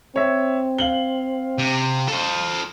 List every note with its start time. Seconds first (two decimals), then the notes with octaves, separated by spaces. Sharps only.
0.16 C4 C#5 E5
0.79 F5 F#7 G7
1.58 C3
2.08 A4 C5